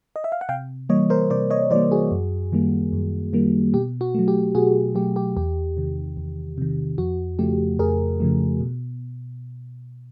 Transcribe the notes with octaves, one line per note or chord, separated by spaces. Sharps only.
D#5
E5
F5
F#5
C3 F5 G5
E3 G3 A#3 C#5 D#5
A#4 C5
C3 C5 D5
C#5 D#5
E3 G3 A#3 C5 D5
F#4 G#4
F#2
D#3 G3 A#3
F#2
D#3 G3 A#3
B2 G4
F#4
F#3 A3
G4
B2 F#4 G#4
F#3 A3 G4
G4
E2 G4
C3 D#3
E2
C3 D#3
F2 F#4
C#3 F3 A3 G4
F2 G#4 A#4
C#3 F3 A3
B2